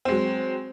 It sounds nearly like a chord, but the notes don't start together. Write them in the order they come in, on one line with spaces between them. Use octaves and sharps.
C4 G#3 F#3